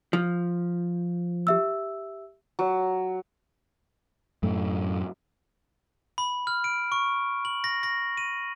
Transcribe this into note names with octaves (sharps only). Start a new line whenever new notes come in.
F3
G4 E5 E6
F#3
F#2 A2 A3
B5
F6
D7
C#6
F#7
A#6
A#6
D#7